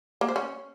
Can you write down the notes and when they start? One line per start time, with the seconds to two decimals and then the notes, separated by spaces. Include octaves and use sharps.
0.21 A#3
0.28 C5
0.36 C#4